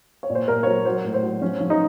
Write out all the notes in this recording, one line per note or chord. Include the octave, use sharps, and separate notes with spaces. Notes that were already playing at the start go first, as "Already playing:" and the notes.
C#5
A#2
C5
A#2 A#4
C#5
F#3 C5
F#3 C5
A2
C5
F#3
F3 C#4
F3
D#4